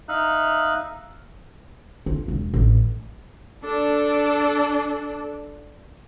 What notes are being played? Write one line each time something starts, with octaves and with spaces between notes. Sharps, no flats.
D#4 E5 F5 F#6
F4
E1
A1
D4 A4